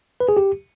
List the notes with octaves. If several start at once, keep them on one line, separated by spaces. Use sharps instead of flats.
B4
G#4
G4